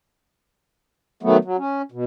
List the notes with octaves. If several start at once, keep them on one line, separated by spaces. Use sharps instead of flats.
D#3 F#3 A3 B3
F#3
C#4
B2